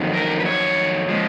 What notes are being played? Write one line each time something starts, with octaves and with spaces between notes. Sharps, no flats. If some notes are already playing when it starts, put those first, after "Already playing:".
Already playing: F2 D#3 F#3
A#4
B4
C#5
F3 G#3